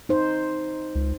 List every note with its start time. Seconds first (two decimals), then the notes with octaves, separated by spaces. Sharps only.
0.09 D#4 C5
0.95 C#2